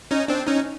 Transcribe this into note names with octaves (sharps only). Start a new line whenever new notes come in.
C#4 D#4
C4 D4
C#4 D#4